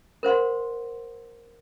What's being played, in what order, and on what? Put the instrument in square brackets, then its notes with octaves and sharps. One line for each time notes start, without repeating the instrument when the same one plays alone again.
[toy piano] A#4 C5 F#5 C6